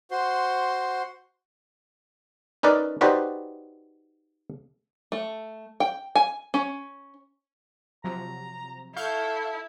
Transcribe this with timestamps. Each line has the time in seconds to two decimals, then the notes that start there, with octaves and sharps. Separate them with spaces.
0.11 F#4 C5 C6
2.63 C#4 D#4 A#4 B4 D5
3.01 D#4 F#4 G4 B4 C5 D5
5.12 A3
5.80 G5
6.15 G#5
6.54 C#4
8.04 C3 F3 F#3 A#5
8.96 E4 A4 F5 C#6 G6